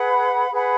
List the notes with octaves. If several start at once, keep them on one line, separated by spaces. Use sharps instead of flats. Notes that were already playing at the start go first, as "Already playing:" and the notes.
Already playing: G#4 B4 F#5 B5
G#4 B4 F#5 B5